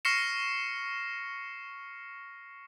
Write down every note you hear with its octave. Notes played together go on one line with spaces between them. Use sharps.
C#6 F6 A#6 C7 C#7 E7